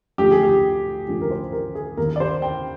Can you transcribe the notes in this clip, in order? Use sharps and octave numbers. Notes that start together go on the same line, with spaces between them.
D2 D3 F3 G4
G#4
G4
D2 D3 F3
A#4
C5
A#4
G#4
D#2 D#3 A#3 A#4
D5
C5
G5